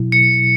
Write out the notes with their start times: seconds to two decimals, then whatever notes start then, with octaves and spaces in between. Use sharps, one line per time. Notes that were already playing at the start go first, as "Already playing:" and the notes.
Already playing: B2 F#3 E4
0.12 C#7